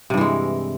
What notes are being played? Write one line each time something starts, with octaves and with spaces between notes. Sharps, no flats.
G2 C3 E3 G#3